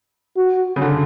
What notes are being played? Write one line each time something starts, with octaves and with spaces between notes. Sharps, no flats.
F#4
C#3
D3